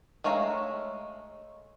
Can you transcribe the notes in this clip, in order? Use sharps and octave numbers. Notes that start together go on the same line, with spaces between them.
G#3 A3 C#5 F5 A#5